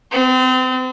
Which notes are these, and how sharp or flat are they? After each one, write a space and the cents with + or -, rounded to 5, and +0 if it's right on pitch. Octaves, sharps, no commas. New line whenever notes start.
C4 -35